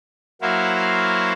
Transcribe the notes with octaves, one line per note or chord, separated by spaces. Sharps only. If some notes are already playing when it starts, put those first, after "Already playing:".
F#3 A#3 E4 F#4 C5 F5